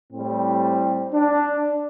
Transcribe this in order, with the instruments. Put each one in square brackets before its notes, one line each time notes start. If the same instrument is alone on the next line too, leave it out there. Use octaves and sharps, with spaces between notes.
[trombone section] A2 G3 C4
D4